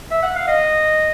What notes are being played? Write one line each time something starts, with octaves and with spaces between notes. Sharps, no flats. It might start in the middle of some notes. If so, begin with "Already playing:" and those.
E5
F#5
F5
D#5